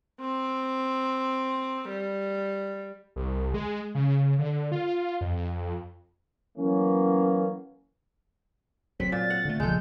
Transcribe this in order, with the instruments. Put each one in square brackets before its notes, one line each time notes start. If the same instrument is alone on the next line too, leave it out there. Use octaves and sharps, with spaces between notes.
[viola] C4
G3
[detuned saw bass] C2
G#3
C#3
D3
F4
F2
[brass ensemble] E3 F#3 A#3 B3 C#4
[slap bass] F#3 [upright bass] C4 [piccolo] B6
[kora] A#2 [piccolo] A6
[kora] F#5
[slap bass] D3 A3
[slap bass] C#2 A#2 [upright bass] C#3 F3 [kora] G#3 A4 [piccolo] G6